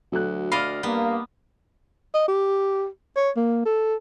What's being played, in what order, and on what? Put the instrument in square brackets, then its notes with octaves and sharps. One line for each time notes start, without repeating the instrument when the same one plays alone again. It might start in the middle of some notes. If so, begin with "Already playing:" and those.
[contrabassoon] D2 [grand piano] F#3 A4 F#6
[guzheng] D5 D#5 F5 [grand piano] B5 F6
[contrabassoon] G2 [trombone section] A#3 [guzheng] B3
[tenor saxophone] D#5
G4
C#5
A#3
A4